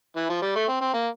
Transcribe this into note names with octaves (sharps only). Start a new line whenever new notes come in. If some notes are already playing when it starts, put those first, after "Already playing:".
E3
F3
G3
A3
C4
C4
A#3